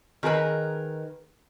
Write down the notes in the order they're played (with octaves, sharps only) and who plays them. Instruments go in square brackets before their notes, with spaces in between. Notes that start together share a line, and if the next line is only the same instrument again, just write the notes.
[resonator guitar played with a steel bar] D#3 G#4 A#4 B4